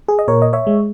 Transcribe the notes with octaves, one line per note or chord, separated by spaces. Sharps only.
G#4
D#5
A#2 A#4 C#5
D#5
C#5 E5
G#3